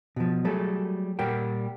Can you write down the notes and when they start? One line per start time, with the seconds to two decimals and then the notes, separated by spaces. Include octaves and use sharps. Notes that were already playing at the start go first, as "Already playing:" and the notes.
0.16 B2 F3
0.45 F#3 G3 A3 G#4 A4
1.19 A#2 G3 A#4 F#5 G5